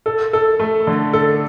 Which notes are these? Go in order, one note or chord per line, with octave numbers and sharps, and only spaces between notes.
A4
A4
A3
D3
A4